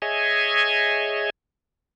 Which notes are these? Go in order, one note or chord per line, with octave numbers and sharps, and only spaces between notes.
G#4 C#5 D#5 E5 G#5